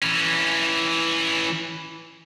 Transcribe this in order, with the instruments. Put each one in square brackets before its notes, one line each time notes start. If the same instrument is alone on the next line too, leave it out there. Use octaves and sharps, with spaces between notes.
[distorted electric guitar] E3 C#4